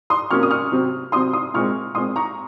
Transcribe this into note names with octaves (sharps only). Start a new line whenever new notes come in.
C6 D#6
C3 F#3 A#3 C#4 C#6 F6
D#6
C#6 F6
C3 F#3 C4
C3 F#3 C4 C6 D#6
C6 D#6
A#2 G#3 C4 C#6 F6
A#2 G#3 C4 C6 D#6
A#5 C#6